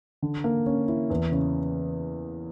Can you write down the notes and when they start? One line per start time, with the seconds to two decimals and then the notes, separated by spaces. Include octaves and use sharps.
0.22 D3
0.44 A#3
0.66 C#4
0.88 E4
1.10 E2
1.32 C#3